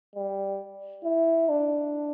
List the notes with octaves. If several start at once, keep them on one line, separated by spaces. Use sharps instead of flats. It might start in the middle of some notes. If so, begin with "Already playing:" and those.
G3
E4
D4